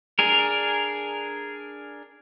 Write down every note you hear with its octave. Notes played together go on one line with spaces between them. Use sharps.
D4 G#4 A#4